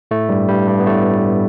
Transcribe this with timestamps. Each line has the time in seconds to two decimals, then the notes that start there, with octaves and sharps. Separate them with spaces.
0.11 A2 A3
0.29 G2 G3
0.49 G2 G3
0.68 G2 G3
0.80 B3
0.87 A2 A3